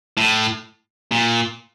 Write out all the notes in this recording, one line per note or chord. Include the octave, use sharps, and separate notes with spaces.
A2
A#2